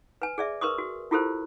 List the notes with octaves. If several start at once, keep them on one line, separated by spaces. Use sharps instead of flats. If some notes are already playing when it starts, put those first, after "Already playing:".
B4 G#5
G#4 D5 E5
A#4 B4 C6 C#6 D#6
F#4
E4 F4 G4 A4 A#4 C5